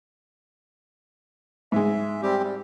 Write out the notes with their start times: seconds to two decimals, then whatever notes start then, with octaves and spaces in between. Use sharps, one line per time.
1.72 G#2 G#3 E5
2.22 G3 C4 G4
2.43 G3